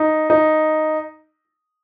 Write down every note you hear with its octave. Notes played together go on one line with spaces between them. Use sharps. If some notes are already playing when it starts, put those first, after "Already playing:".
Already playing: D#4
D#4